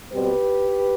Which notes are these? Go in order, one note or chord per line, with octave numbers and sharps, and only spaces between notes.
B2 G3 C4 G4 B4